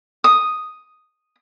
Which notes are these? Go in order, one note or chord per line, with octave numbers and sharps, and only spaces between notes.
D#6